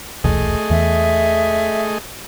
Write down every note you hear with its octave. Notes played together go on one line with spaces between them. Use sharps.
D#1 B1 E2 A3 G#4 D#5
E2 E3 E5